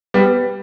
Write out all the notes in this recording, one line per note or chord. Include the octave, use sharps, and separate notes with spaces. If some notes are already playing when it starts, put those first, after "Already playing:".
G3 B3